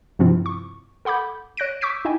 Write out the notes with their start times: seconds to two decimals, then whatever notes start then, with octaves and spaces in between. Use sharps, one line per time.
0.19 G2 C3 F3 C4 E4 F4
0.46 C#6
1.05 A4 F#5 B5 D6 G6
1.57 C#5 F#6 A#6 D7
1.81 C#6 D6 E6 G6 B6 D7
2.05 D#4 E4 D#5 G5 G#5